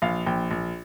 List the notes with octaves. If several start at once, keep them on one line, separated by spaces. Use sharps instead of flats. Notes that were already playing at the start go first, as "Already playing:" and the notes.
A#1 F5
A#1 G5
A#1